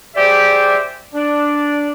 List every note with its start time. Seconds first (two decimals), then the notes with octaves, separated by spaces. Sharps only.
0.15 G4 G#4 C5 D5 E5
1.14 D4